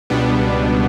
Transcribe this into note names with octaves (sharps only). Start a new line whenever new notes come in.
C#2 B2 G3 B3 D4